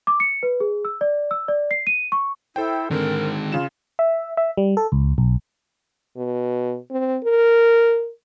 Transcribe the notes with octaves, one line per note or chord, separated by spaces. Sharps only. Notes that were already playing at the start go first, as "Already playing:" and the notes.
D6
C#7
B4
G#4
E6
D5
E6
D5
C7
D#7
C#6
E4 A4 C5 G5
D3 D#3 G#3 C4 A#4
C#3 F4 E7
E5
E5
G3
A4
C#2
B1
B2
C4
A#4